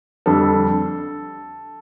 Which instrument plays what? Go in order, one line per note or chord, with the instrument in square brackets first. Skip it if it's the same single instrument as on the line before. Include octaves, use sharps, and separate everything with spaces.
[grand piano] F2 D3 G3 D4 A4